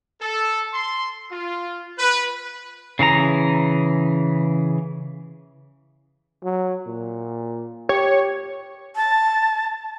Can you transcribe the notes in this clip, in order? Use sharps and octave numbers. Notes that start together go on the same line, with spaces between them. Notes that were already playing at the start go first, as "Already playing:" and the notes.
A4
C6
F4
B4
C#3 E3 G#4 A#5
F#3
A#2
G4 C#5
A5